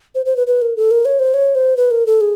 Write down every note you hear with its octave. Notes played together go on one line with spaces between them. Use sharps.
C5
C5
B4
B4
A#4
A4
A#4
C#5
C5
C#5
C5
B4
A#4
A4
G#4